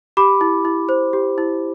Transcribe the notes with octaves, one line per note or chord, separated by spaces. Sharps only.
G4 B5 D6
E4
E4
C5
G4
E4